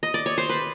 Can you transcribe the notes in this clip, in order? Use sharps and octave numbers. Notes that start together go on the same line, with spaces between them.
D#5
D5
C#5
C5
B4